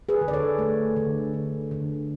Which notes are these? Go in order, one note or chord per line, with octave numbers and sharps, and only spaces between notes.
G#4 B4
D3
D5
A4 C#5
A3
D3
D3
D3